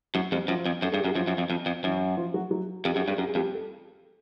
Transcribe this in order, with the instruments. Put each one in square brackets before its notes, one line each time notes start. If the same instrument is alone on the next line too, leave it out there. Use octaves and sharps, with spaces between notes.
[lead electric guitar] F#2 [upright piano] F#3 F#4
[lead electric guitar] F2 [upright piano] G3 G4
[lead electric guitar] F#2 [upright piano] F3 F4
[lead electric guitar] F2
[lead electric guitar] F#2 [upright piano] A4
[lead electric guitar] G2 [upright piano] G#4
[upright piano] G4
[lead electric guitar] F#2
[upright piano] F#4
[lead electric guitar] F#2 [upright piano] F3 F4
[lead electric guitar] F#2
F2
F2
F2
[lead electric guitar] F#2 [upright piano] E3 E4
[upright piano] F3 F4
F#3 F#4
F#3 F#4
[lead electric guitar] F2 [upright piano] G4
[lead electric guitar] F#2 [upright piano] G#4
[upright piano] G4
[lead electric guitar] G2 [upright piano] G#4
[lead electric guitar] F#2 [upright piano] G4
[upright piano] G#4
[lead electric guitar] F2 [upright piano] G3 G4
[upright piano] A4